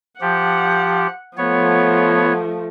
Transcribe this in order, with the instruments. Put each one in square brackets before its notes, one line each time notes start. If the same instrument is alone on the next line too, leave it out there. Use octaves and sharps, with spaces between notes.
[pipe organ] F3 G4 [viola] F#5
[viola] F3 A3 [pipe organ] B3 C#5